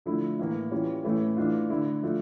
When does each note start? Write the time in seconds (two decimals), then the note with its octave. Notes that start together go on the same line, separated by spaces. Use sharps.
0.06 D3 F3 A3 E4
0.39 A2 E3 A#3
0.71 E3 G3 C#4 F4
1.04 A2 E3 A3 C#4 E4
1.37 E3 A3 D4 F4
1.70 D3 A3 E4
2.03 F3 A3 D4 F4